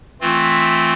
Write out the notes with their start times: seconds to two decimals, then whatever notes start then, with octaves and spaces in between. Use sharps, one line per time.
0.21 E3 A3 C4 F4